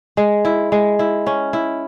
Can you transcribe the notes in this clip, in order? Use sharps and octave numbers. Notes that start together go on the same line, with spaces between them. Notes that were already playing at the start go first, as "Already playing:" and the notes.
G#3
E4
G#3
E4
C#4
E4